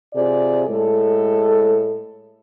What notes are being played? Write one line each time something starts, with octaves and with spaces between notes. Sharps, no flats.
C3 F4 G#4 C5 D5
A2 G#3 A4